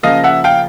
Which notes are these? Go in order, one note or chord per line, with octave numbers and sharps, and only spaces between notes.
C#3 F3 A#3 D#5 F5
E5 F#5
F5 G5